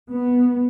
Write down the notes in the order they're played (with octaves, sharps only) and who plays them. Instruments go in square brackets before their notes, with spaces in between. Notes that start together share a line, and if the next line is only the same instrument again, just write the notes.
[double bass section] B3